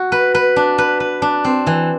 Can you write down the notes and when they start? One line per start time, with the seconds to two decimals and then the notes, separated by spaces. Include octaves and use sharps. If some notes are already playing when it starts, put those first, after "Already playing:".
Already playing: F#4
0.12 B4
0.35 B4
0.56 D4
0.78 B4
1.00 B4
1.22 D4
1.44 C4
1.67 E3